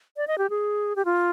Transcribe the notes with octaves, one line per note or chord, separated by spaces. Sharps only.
D5
D#5
G4
G#4
G4
F4